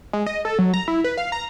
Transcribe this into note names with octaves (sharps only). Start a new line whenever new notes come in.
G#3
D#5
A4
F#3
A#5
E4
B4
F5
A#5